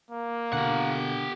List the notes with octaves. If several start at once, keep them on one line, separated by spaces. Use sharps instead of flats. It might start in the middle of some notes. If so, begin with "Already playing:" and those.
A#3
B2 D3 G4 F#5